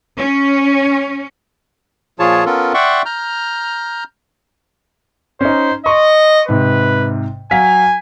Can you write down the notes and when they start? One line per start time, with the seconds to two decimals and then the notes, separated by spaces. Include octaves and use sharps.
0.18 C#4
2.19 A#2 F3 F4 G#4 C#5 A5
2.46 B3 C#4 F4 A4 A#4
2.74 D5 E5 F#5 G5 C6 C#6
3.06 A#5 F6 G6
5.41 C#4 D#4 C5
5.86 D#5 C6 C#6
6.49 G#2 C3 B4
7.51 F#3 F5 G#5 B6